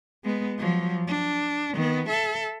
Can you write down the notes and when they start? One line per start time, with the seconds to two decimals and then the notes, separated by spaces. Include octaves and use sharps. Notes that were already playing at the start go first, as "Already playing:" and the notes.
0.24 G#3 B3
0.58 F3 F#3
1.07 D4
1.74 D#3 B3
2.09 A4 E5